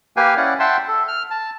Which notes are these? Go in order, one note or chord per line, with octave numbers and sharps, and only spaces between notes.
A#3 G4 B4 F5 G5 G#5
C#4 E4 D5 F#5
E5 F#5 G5 A5 C6 E6
A4
F6
A5